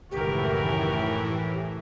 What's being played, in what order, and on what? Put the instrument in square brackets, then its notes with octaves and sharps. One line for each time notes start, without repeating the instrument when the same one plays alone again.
[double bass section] C#2 F#2 D#3 [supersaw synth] A2 E3 [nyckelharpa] F#4 A#4 [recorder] G4